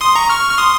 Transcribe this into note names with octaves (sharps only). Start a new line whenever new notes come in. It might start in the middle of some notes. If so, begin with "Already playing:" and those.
C6 D#6
A#5 C#6
C#6 F6
F6
C6 D#6